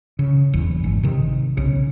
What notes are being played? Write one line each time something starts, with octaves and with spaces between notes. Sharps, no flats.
C#3
F#1 E2
G#1
C3 D#3
B1 C#3